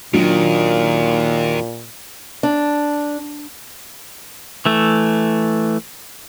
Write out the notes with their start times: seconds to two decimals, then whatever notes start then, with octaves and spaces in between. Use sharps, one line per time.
0.13 D#2 A#2 D#3 F#3 D4 F4
2.43 D4
4.66 E3 A3